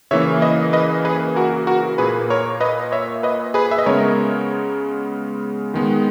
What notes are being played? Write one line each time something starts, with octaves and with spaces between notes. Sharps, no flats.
C#3 E3 A#3 C#5 E5
B4 D#5
B4 D#5
G#4 B4
F#4 A#4
F#4 A#4
A#2 A#3 G#4 B4
A#4 C#5
B4 D#5
C#5 E5
B4 D#5
G#4 B4
E5
D#5
C#3 G#3 B3 A#4 C#5
D#3 G#3 B3